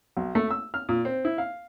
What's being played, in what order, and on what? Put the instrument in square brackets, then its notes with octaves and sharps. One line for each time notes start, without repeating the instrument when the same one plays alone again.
[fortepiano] B1
A3
E6
F6
A#2
C4
E4
F5